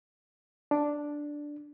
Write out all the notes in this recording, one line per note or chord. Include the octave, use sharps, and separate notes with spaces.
D4